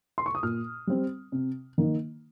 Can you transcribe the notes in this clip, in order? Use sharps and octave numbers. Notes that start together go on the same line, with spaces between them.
C6
C#6
D#6
A#2 F6
G3 C4
C3
D#3 A#3 D#4